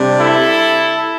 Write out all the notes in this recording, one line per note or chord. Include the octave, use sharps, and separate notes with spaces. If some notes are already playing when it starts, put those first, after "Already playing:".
Already playing: C3 G3 D4
E4 A4